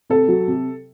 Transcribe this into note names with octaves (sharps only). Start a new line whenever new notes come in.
C3 A4
F#3
C3